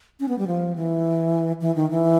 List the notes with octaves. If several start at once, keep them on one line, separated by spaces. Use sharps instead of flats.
C#4
B3
G3
F3
E3
E3
D#3
E3